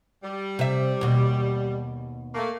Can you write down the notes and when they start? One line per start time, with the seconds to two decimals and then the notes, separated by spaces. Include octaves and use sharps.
0.23 G3
0.59 C3 E5
1.01 D#2 B2
2.35 A3 A#3